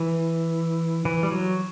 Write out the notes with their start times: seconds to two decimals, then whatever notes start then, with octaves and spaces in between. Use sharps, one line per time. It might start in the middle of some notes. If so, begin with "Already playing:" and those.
Already playing: E3
1.05 E3
1.23 G3
1.31 F#3